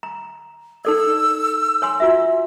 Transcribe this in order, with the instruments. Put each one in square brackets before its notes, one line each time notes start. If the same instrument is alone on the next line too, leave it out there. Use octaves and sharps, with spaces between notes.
[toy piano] A#5
[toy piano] D#4 A4 D5 [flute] E6
[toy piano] C#5 G#5 C6
F4 F#4 E5